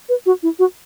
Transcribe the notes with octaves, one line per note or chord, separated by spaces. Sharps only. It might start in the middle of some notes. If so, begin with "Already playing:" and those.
B4
F#4
E4
F#4